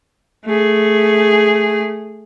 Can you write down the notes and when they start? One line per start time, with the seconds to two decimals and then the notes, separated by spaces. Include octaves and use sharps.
0.45 A3 G#4